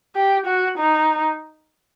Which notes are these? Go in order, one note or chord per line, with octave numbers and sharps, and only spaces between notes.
G4
F#4
D#4